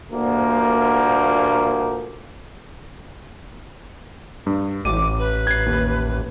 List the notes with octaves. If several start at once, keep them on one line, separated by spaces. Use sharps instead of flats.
D2 G2 A#2 D3 F3 A#3
G2
A1 D6 D#7
B4
G#6 C7
D#2